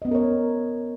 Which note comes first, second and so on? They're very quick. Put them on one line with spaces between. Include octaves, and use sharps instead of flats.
D#5 B3 C#4 A#4 C#5